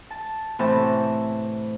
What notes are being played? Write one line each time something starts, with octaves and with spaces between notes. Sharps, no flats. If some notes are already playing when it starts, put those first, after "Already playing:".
A5
A2 C3 E3 C4 E5 A5